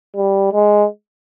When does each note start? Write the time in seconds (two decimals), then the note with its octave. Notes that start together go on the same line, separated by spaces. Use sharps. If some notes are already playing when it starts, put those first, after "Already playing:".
0.16 G3
0.53 G#3